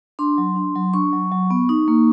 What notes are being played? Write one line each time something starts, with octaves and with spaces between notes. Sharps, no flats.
D4 C6
F#3
D4
F#3
D4 C#6
F#3
F#3
B3
D#4
A#3